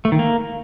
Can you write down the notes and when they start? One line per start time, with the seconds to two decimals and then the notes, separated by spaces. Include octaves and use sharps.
0.05 A3
0.12 D#3
0.19 A#3